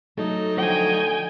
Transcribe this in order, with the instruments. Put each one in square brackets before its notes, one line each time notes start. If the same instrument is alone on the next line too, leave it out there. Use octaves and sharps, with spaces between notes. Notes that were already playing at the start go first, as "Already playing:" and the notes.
[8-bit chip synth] F#3 D#4 D#5 [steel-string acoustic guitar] A3 A4
[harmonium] D3 [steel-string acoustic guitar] F3 F4 [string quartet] G5 G#5